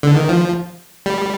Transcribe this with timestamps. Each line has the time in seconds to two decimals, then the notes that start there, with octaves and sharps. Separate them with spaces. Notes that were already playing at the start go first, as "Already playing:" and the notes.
0.03 D3
0.16 D#3
0.29 F3
1.06 G3